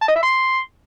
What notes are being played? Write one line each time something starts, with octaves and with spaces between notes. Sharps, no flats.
A5
D#5
E5
C6